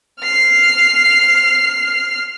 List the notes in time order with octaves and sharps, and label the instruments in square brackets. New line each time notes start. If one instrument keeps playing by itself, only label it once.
[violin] F6 C7